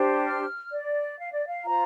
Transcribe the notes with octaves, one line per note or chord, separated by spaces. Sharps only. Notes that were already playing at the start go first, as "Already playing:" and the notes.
Already playing: D4 G4 C5
F6
D5
F5
D5
F5
F4 C5 A#5